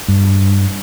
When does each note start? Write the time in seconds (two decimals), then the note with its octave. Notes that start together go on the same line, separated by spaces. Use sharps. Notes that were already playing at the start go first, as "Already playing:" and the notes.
0.08 G2